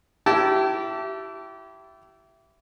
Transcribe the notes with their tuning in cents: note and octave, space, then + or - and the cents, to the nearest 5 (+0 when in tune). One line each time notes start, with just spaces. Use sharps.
E4 +15 G4 -30 A5 +0